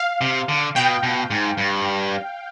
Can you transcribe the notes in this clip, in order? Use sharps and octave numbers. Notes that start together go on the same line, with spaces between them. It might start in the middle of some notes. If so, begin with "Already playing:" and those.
Already playing: F5
C3
D3
B2 G5
B2
G#2
G2